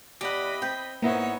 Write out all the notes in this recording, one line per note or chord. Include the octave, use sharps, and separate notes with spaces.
E2 G4 D#5 F#5 B5
C4 G5
G#2 A#3 B3 D#4 E4 C#5